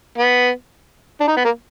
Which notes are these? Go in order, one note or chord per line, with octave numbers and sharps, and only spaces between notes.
B3
D4
D#4
B3
A#3